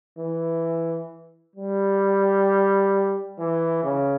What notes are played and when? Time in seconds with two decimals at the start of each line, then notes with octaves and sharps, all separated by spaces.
0.19 E3
1.56 G3
3.39 E3
3.84 C#3